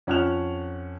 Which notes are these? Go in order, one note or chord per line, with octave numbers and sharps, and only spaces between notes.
F2 C#4 F#5 F6 F#6 F7